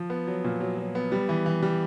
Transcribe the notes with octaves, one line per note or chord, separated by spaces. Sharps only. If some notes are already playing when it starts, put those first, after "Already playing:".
Already playing: F3
B3
F#3
A#2
F#3
F#3
B3
G3
E3
E3
G3